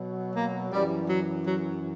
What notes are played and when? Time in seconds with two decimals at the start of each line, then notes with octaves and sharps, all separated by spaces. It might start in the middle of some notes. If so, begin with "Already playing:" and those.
Already playing: B2 F#3
0.35 A#3
0.72 F#2 E3 G3
1.08 F#3
1.45 F#3